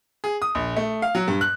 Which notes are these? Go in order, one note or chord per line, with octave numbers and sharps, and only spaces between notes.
G#4
D#6
A#1
A3
F5
F#3
G2
F#6